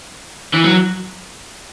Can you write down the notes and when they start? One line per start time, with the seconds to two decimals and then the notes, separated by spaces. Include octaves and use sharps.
0.54 E3
0.64 F#3